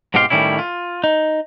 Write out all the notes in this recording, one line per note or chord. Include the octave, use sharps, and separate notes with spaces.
G#2 B2 C4 G4 F5 C6
A2 D#3 G3 C#4 E4
F4
D#4